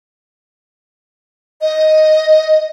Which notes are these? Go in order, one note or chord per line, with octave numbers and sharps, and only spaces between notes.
D#5